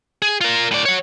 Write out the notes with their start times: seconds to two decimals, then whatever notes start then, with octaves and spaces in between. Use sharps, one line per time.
0.22 G#4
0.41 F4 A#4
0.71 A2 D5
0.85 C#5 F#5